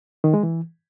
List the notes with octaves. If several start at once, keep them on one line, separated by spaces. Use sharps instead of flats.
D#3
G#3
E3